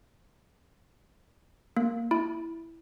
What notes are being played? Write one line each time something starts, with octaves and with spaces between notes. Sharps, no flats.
A#3
E4